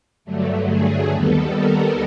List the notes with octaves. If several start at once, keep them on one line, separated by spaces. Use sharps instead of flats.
G2 D3 F#3 A3
G#4
D#2 D#3 G3 B3 A4
A#4